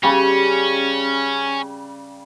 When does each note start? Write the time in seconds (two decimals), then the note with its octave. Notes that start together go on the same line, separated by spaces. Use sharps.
0.03 C#3 G3 C#4